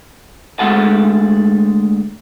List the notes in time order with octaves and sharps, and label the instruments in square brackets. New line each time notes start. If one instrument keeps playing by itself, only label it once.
[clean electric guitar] D2 G#3 A4 F#5 A5